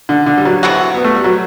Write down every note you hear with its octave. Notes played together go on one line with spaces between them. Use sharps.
D3
D3
G3
F#3
C3 E3 B3 F#4
B3
A3
G3
F#3